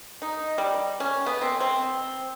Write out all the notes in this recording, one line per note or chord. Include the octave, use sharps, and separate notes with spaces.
D#4
G3
C#4
B3
C4
C4